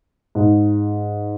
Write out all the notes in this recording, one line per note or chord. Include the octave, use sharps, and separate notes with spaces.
G#2